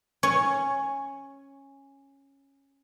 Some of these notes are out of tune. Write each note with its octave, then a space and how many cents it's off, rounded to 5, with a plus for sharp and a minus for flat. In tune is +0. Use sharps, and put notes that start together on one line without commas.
C#4 -10 C#5 +5